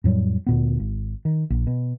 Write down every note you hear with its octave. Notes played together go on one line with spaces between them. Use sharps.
F2 A2 F#3 G3
D2 A#2 B3
G#1
D#3
A#1
B2